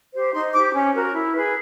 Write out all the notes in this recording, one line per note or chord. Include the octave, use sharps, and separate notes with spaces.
G4 C5
D#4 C6
G4 C5 D6
C#4
F#4 A#4
E4
G#4 B4